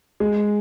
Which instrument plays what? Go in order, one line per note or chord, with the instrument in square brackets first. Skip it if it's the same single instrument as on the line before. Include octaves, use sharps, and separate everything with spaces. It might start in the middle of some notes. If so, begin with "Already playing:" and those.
[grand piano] G#3